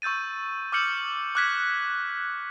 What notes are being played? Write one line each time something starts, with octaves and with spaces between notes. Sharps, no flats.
C#6 E6 G6 A6 D#7
D6 E6 F6 G6 C#7 F#7
D6 F6 F#6 G#6 B6